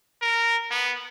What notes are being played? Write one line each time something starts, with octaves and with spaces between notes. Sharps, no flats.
A#4
B3